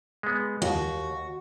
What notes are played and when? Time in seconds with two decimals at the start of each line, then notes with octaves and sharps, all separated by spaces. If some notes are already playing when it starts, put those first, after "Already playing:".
0.23 G#3 B3
0.62 D#2 F#4